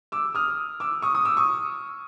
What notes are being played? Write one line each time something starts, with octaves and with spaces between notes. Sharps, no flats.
D6 E6
D#6 F6
D6 E6
C#6 D#6
C#6 D#6
D6 E6
C#6 D#6